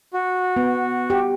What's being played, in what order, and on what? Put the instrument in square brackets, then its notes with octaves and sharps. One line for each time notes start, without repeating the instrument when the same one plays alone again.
[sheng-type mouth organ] F#4
[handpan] B3
G4